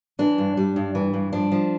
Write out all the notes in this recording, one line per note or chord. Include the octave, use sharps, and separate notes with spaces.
E3 D4
G2
G3
G2
E3
G2
F3 D4
F3